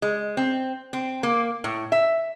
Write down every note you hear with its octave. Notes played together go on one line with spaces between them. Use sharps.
G#3
C4
C4
A#3
A2
E5